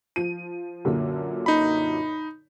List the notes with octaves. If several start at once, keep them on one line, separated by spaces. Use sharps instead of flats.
F3 D#7
F#2 A#2 D3
D#4 B5